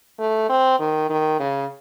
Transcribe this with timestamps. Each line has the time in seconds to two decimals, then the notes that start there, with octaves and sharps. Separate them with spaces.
0.19 A3
0.49 C4
0.80 D#3
1.10 D#3
1.40 C#3